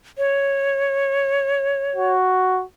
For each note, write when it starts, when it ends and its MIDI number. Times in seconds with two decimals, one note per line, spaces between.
0.18 2.12 73
1.96 2.63 66